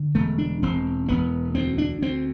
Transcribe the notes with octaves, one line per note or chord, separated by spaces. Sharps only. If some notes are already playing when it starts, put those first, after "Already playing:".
Already playing: D3
E1 A3
D4
E1 C4
E1 B3
D2 C4
D4
D2 C4